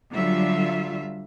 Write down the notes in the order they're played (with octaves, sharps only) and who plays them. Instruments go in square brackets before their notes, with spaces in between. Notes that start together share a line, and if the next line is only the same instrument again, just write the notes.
[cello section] D3 F#3 G3 F4 E5